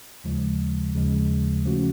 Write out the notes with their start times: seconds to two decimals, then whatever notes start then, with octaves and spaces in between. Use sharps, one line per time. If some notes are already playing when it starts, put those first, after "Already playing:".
0.24 D#2 C#3 F3 G#3
0.94 D#2 C#3 F3 G#3
1.64 C#3 F3 A3 C#4 F#4